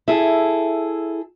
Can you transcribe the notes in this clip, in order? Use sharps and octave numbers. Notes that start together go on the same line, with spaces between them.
E4 G#4 A4